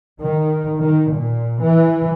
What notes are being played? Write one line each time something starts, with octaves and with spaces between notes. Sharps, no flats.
D#3
D#3
A#2
E3